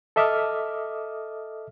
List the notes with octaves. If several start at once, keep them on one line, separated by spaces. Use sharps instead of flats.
A4 D#5 E5 D6 D#6 F6